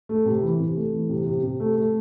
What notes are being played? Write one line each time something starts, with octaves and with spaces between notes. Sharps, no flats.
A3
C3
E3
C3
A3
E3
C3
C3
C3
A3
A3